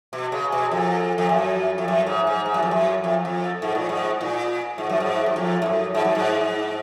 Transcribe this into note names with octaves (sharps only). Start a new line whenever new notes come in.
B2
C#3
B2
F2
F2
F#2
F2
F#2
G#2
G#2
G#2
F#2
F2
F#2
F2
F2
G#2
A#2
G#2
A#2
G#2
F#2
G#2
F#2
F2
G#2
F#2
G#2
F#2
G#2